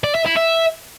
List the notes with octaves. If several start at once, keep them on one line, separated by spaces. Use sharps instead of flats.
D5
E5
E4
E5